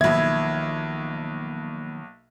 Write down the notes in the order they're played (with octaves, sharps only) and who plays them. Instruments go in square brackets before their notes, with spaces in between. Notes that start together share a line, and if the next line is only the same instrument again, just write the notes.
[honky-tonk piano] B1 G#6 [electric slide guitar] D#3 F3 [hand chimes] A#3 B5 [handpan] E5